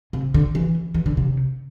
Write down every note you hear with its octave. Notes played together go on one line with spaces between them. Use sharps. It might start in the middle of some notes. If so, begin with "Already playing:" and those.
C3
D3
E3
E3
D3
C3